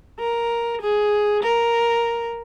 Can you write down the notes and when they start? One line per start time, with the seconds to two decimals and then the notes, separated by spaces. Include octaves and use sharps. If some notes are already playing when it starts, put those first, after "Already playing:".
0.19 A#4
0.82 G#4
1.43 A#4